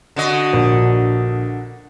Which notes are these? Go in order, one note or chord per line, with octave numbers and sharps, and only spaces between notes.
D3 F#4 D#5
A#1